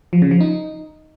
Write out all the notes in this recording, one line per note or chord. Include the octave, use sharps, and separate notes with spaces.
F3
C#3
F3
D#4